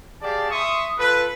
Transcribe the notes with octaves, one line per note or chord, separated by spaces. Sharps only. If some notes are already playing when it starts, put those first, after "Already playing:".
G4 G#4 D5 F5 A5
E5 C6 C#6 D#6
F4 A4 B4